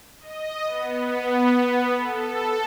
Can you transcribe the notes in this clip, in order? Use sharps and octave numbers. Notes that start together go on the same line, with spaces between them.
D#5
B3
A4